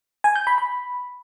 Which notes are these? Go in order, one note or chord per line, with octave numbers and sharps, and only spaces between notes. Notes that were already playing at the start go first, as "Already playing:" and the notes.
G#5
G6
B5
B5